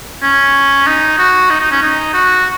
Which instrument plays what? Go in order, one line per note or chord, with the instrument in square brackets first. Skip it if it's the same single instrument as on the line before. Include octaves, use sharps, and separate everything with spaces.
[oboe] C#4
D#4
F#4
D#4
D#4
C#4
D#4
F#4